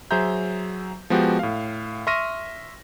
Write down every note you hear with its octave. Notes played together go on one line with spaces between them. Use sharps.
F#3 G#4 C5 E5 A#5 G6
F3 G#3 B3 F#4 G4
A2 F5
E5 C6 C#6 F6 A#6 D#7